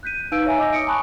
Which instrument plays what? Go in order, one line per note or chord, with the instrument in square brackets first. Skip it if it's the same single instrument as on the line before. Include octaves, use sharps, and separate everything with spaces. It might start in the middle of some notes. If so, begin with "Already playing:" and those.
[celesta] F#6 G6 B6 D#7
D#4 B4 F5 E6 G6 D7
C#5 E5 G#5 A#5
D#5 G#5 D6 E6 G6 A#6
D#6 C#7 D7
G#5 A5 B5 C#6 D#6 F#6